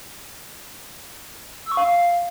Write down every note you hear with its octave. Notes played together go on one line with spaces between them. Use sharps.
E6
C#6
F5